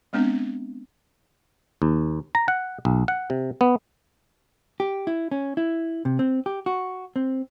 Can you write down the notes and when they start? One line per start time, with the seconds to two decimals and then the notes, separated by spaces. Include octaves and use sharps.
0.13 G#3 B3 C4 D4
1.82 D#2
2.35 A#5
2.48 F#5
2.85 B1
3.08 F#5
3.30 C3
3.61 B3
4.80 G4
5.07 E4
5.31 C#4
5.57 E4
6.05 C3
6.19 C4
6.46 G4
6.66 F#4
7.16 C4